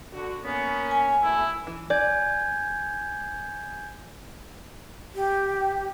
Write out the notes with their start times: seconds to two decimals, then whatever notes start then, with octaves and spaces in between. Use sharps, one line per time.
0.12 D3 F#4
0.43 A#3 B3 C#4
0.91 G#5
1.23 B2 A3 E4
1.67 E3
1.90 D5 G#5 G6 G#6
5.14 G4